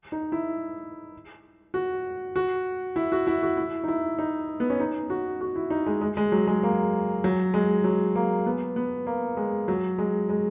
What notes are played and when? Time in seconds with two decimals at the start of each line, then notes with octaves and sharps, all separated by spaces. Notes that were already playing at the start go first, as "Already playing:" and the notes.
0.12 D#4
0.32 E4
1.74 F#4
2.36 F#4
2.96 E4
3.12 F#4
3.27 E4
3.43 F#4
3.57 E4
3.84 D#4
3.88 E4
4.19 D#4
4.60 B3
4.70 C#4
4.80 D#4
5.10 F#4
5.41 F#4
5.56 E4
5.70 D#4
5.86 G#3
6.01 G#3
6.17 G#3
6.32 F#3
6.47 G#3
6.63 A#3
7.24 F#3
7.54 G#3
7.84 F#3
8.15 A#3
8.46 B3
8.76 B3
9.07 A#3
9.37 G#3
9.68 F#3
9.98 G#3
10.29 G#3